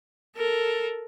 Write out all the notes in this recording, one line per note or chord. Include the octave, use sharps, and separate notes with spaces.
A4 A#4